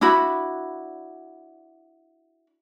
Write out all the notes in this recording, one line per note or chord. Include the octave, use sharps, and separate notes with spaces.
D4 E4 F#4 B5